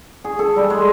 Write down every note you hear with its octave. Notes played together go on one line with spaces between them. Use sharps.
G#4
A4
G3
G#3